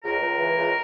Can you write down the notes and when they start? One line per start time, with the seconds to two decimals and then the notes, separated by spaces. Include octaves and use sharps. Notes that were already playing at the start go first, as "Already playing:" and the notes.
0.03 C#2 A#4
0.21 C#2
0.38 E3
0.57 C#2